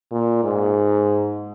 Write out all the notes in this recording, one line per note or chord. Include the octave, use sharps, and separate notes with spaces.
A#2
G#2